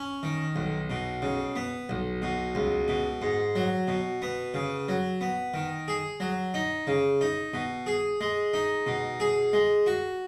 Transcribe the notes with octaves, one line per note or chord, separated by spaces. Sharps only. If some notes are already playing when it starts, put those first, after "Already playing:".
Already playing: C#4
D#3
B1
B2
C#3
B3
B1
B2
C#2
B2
G#2
F#3
B2
B3
C#3
F#3
B3
D#3
G#4
F#3
D#4
C#3
D#4
B2
G#4
G#3
D#4
B2
G#4
G#3
F#4